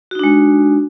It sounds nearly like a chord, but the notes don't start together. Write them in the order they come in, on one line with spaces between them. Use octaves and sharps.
F#4 D#4 D4 G#3